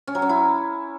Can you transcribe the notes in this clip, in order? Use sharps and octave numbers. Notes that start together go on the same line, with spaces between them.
C#4
F#3
C#4
E4